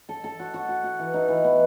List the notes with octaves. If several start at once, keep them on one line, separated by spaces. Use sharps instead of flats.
A4
A4
F#4
F#4
F#4
F#4
E3
D#4
E3
B3